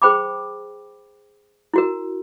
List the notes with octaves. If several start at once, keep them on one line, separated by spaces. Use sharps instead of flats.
G#4 C5 G5 B5 D6
E4 F#4 A#4